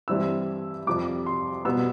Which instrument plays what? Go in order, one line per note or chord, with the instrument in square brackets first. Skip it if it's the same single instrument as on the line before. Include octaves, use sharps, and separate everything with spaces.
[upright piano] G2 E3 G3 C4 E4 E6
F2 C3 G3 D6
C6
B2 G3 B3 E6